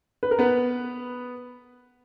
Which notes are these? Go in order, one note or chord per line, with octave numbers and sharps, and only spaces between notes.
B4
A#4
B3 B4